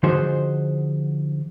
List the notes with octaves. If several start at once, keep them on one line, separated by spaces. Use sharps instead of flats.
D3 F3 D#4 F#4 G#4 C5